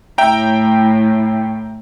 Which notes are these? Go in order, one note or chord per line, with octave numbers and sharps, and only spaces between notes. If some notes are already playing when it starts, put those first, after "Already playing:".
A2 E5 G5 A#5